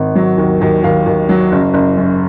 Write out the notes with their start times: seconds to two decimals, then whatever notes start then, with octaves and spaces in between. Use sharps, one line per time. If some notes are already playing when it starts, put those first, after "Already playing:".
Already playing: G#1
0.15 F#3
0.38 D#2
0.61 D#2
0.84 D#2 F5
1.06 D#2
1.29 F#3
1.52 F#1
1.74 F#1
1.97 F#2